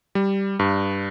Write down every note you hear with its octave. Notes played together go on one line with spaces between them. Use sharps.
G3
G2